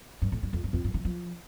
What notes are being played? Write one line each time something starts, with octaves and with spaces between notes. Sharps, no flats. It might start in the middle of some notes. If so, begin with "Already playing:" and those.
G2
A2
G2
F2
G2
F2
G2
D#3
F3